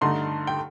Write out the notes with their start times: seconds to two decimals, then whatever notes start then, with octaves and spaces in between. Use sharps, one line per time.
0.01 G2 D3 A3 D#4 C6
0.47 G5